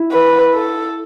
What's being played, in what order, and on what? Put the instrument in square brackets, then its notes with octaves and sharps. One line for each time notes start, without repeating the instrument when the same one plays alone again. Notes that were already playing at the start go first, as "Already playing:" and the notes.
Already playing: [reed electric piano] E4
[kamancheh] B4
A4